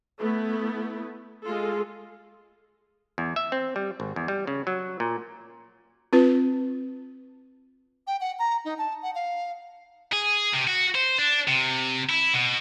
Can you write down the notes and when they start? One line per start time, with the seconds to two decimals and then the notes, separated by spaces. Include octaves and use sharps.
0.19 A3 B3 E4
1.43 G#3 F4 A4
3.18 E2
3.36 E5
3.52 C4
3.76 G3
4.00 G#1
4.16 E2
4.28 G3
4.47 C#3
4.67 F#3
5.00 A#2
6.13 C4 F4 B4
8.07 G5
8.21 F#5
8.39 A#5
8.65 D#4
8.78 A5
9.02 F#5
9.15 F5
10.13 G#4
10.53 C3
10.67 F#4
10.95 C5
11.19 D4
11.48 C3
12.10 E4
12.34 B2